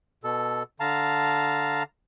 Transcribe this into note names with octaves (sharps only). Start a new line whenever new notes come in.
B2 A4
D3 F5 A5 A#5